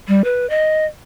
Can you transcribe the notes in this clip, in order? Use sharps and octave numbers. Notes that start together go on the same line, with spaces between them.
G3
B4
D#5